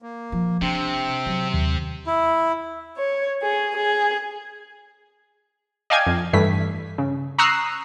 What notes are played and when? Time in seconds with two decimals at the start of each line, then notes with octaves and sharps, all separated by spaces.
0.02 A#3
0.32 F3
0.62 C3 C4 D4
1.26 F#3
1.54 D#2
2.07 E4
2.98 C#5
3.42 G#4
3.77 G#4
5.90 D5 D#5 F5 G5 G#5 G#6
6.07 F2
6.33 G2 E3 G3 A3 B6
6.98 C#3
7.38 A#5 C#6 D#6 E6 F#6 C7